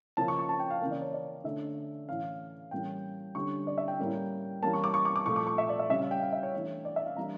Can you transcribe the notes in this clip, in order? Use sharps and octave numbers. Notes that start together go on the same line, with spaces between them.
C#3 F3 A#3 C#4 A5
C#6
C#6
A5
G5
F5
C#3 E3 A#3 C#4
D5
C#5
D5
D3 A3 C#4 E5
A2 E3 A3 C#4 F5
A2 E3 G3 A#3 C#4 G5
D3 G3 C#4 C#6
D5
E5
G5
A2 G3 A#3 C#4
E3 G3 A#3 C#4 A5
C#6
D6
C#6
D6
D6
A#2 F3 A3 C#6
D6
C#6
E5
D5
E5
C#3 G3 C#4 E5
F5
G5
F5
E5
C#5
E3 A3 D4
D5
E5
F5
E3 G3 A#3 D4 A#5